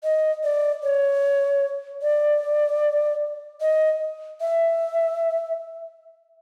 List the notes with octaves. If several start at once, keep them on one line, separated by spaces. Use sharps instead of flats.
D#5
D5
C#5
D5
D#5
E5